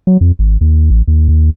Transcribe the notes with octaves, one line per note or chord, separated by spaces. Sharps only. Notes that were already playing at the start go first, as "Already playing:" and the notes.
F#3
F2
G#1
D#2
A1
D#2
D#2